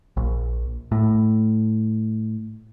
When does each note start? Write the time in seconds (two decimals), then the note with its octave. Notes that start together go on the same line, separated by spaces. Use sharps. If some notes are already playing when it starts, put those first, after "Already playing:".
0.17 A#1
0.92 A2